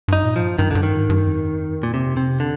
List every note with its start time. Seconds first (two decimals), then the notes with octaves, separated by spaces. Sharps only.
0.08 G2 D#4
0.24 A#2
0.36 F3
0.41 G2
0.59 G2 D#3
0.71 G2 D3
0.83 D#3
0.93 G#2
1.10 G2
1.27 F2
1.83 A#2
1.94 C3
2.17 C3
2.40 D3